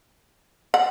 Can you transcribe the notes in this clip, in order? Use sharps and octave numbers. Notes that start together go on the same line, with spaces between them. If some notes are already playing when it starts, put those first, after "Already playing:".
F#5